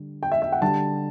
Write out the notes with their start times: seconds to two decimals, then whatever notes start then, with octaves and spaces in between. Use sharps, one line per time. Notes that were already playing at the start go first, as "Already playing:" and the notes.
Already playing: D3 G3
0.23 G5
0.32 E5
0.42 E5
0.52 F#5
0.61 D3 G3 A5